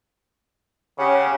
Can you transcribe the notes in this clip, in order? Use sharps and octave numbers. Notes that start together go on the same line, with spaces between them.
C#3 C#4 G4 F#5